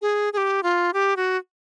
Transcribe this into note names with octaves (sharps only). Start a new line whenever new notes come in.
G#4
G#4
G4
F4
G4
F#4